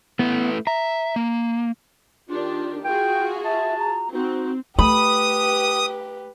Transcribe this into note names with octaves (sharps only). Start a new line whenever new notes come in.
A3 B3 E4 B4
E5 A#5
A#3
D#3 D4 F4 G4
F4 F#4 G#4 G5
E5 A5
A#5
C4 D#4 F#4
A3 G4 B4 B5 D#6